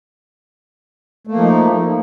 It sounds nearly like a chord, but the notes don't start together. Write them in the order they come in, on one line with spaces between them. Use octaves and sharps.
A3 A#3 F3 D#4